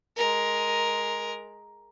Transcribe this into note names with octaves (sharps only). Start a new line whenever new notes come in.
G#3 A#4